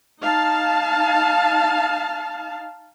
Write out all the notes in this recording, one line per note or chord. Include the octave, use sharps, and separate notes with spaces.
D#4 F5 A5